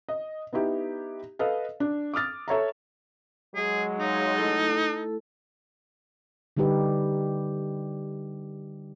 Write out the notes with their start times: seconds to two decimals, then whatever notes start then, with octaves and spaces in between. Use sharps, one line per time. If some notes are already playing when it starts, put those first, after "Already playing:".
0.09 D#5
0.53 B3 D#4 E4 G4
1.39 A4 B4 D#5 F5
1.80 D4
2.14 D6 D#6 F6 A6
2.48 A4 C#5 E5 A#5
3.55 F#3 G#3 G#4
4.00 D#4 C#5 F5
4.37 A3 E4 A4
6.57 D3 G3 D#4 G4 B4